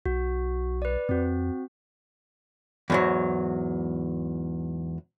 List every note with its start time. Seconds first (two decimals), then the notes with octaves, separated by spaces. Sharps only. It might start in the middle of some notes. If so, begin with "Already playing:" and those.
0.06 B1 F#4
0.82 B4 D5
1.09 F2 C4 F#4
2.90 E2 G#2 F#3